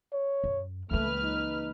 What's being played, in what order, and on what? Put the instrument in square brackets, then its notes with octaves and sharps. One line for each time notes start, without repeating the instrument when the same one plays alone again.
[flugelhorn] C#5
[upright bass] F#2
[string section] C#2 B4 F6 [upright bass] E3 A#3 [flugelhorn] A3
[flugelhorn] D#4